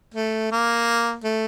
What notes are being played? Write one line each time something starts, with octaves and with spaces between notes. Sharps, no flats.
A3
A#3
A3